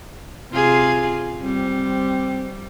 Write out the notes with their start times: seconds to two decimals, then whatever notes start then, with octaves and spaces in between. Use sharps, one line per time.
0.51 C3 F4 G#4
1.43 G3 C4